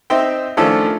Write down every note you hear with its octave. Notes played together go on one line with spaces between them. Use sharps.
C4 D#4 C5 E5 G5
D#3 F3 A3 C#4 D4 A4